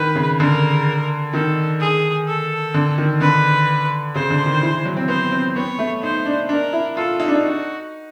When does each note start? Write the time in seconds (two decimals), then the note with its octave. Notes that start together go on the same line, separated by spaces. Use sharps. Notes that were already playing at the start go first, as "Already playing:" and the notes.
Already playing: D#3 B4
0.15 C#3
0.39 D3 A#4
1.33 D#3 A4
1.80 G#4
2.27 A4
2.74 D3
2.98 D#3
3.21 D3 B4
4.15 C#3 C5
4.30 D3
4.46 D#3
4.62 E3
4.85 F#3
4.97 C4
5.08 B3 C5
5.31 C4
5.56 B3 C#5
5.79 A3
6.03 D#4 C5
6.25 D4
6.49 D4 A#4
6.73 E4
6.96 F4 A4
7.20 D#4
7.28 D4
7.35 D#4
7.43 F#4